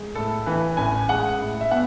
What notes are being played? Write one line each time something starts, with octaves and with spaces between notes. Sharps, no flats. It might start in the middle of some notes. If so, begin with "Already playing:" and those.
Already playing: G#3
A2 A4
E3 B4
A1 G#5
G#3 F#5
A2
E5
B3 F#5